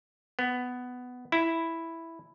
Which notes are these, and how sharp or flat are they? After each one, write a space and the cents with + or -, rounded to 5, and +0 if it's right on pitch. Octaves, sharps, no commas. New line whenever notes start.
B3 +10
E4 +0